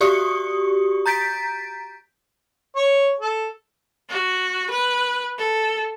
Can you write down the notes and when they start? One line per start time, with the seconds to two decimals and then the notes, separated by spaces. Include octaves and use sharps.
0.01 F#4 G4 D5 C#6 D#6 C#7
1.06 A#5 G6 A6 B6 D7
2.76 C#5
3.20 A4
4.09 F#4
4.70 B4
5.38 A4